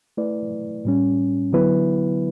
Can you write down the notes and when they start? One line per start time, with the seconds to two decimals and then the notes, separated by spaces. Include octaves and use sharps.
0.17 A3 E4 B4 D5
0.85 A2 G3 C#4
1.52 D3 F#3 B3 E4 B4